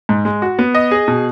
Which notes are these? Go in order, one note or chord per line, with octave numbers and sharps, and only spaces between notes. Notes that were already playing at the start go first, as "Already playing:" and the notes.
G#2
G#3
F#4
B3
D#5
G#4
B2